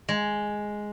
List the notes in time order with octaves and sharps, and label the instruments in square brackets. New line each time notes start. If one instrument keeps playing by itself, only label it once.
[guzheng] G#3